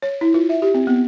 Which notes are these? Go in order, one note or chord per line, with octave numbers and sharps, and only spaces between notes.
C#5
E4
F4
E5
G4
C4
B3